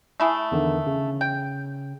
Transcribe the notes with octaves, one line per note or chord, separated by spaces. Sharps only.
A3 E4 G#4
E2 D3 D#3
C#3
G5